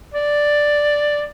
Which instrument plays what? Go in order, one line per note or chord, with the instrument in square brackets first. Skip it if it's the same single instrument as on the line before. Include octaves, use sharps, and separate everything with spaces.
[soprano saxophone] D5